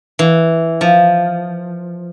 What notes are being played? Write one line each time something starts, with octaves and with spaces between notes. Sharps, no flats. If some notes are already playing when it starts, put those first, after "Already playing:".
E3
F3